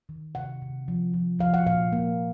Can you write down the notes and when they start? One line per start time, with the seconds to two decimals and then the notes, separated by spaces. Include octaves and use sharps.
0.09 D#3
0.35 C3 F#5
0.62 C3
0.88 F3
1.14 F3
1.39 F3 F5
1.54 F#5
1.66 A#2 F5
1.92 A#3